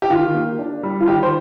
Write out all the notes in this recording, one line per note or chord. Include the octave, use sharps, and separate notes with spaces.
G4
D#3 F4
A#3
D4
G3
F4
D#3 G4
C5